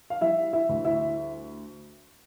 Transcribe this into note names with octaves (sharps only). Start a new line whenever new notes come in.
F5
G3 E4 E5
E4 E5
D2
E4 E5